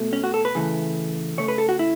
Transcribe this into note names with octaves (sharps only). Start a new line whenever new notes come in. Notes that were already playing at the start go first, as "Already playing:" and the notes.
Already playing: B2 A3
C#4
F#4
A4
B4
C#3 E3 A3
C#3 A3 C#5
B4
A4
F#4
E4